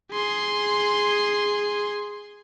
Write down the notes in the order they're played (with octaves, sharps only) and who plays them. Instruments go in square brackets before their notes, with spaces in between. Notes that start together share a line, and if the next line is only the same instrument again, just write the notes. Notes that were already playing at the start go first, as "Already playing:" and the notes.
[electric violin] G#4 C6